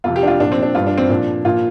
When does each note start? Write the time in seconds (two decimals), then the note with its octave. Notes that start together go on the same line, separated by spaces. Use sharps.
0.04 F2 C3 F3 F4
0.16 G4
0.23 D4
0.27 F4
0.40 A#2 F3 D4
0.52 C4
0.62 D4
0.75 G2 G3 F4
0.87 D4
0.98 C4
1.09 A#2 F3 D4
1.45 A#2 F3 F4